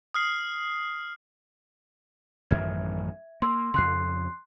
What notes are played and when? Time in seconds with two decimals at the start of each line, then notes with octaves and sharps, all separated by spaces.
0.14 D#6 F6 C7
2.51 A1 F#2 D#3 E5 G#6
3.42 A#3 C6 E6
3.74 F2 C#3 C6 F#6 C7